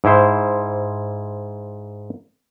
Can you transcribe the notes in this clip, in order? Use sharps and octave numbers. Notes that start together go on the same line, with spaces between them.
G#2 E4 C5